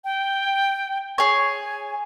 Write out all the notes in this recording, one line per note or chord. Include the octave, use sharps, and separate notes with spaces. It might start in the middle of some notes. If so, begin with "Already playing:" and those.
G5
G#4 C#5 G#5